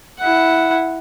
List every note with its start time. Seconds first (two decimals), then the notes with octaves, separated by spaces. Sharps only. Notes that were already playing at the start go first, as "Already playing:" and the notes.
0.19 E4 F#5